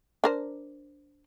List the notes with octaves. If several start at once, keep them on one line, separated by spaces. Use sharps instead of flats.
D4 A#4 C5